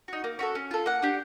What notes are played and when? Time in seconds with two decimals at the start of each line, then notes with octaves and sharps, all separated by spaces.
0.08 D#4 F#4
0.24 A#3
0.39 C#4 F#4 A4
0.55 C#4
0.71 F4 A4
0.86 A#3 F#5
1.02 D4 G4